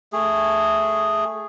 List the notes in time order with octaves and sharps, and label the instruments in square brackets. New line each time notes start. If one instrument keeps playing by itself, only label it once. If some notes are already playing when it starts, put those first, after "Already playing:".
[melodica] A3 G#4